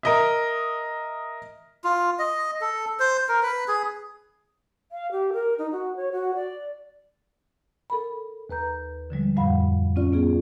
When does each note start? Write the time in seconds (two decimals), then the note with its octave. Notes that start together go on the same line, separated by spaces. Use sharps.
0.03 A#4 D#5 E5
1.84 F4
2.19 D#5
2.61 A4
3.00 C5
3.29 A#4
3.43 B4
3.68 G#4
4.91 F5
5.12 G4
5.33 A#4
5.58 D#4
5.72 F#4
5.97 C#5
6.12 F#4
6.35 D5
7.90 A4 A#4 B5
8.50 D#2 B4 A#5 G6
9.10 D3 F3 G3 G#3
9.36 F2 A2 G3 F5 F#5 B5
9.96 C4 C#4 F4 D5
10.13 B3 F4 G#4